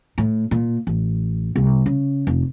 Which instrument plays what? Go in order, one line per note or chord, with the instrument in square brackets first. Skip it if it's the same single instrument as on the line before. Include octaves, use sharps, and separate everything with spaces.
[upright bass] A2
A#2
A1
C2
C#3
F1